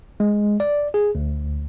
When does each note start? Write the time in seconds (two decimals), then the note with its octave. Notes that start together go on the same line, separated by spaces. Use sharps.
0.20 G#3
0.60 D5
0.94 G#4
1.15 D2